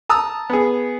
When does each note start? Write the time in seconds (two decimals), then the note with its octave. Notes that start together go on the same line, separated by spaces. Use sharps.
0.09 A5 A#5 D#6 E6
0.50 B3 G#4